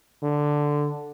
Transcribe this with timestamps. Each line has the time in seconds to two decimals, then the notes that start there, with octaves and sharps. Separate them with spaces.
0.23 D3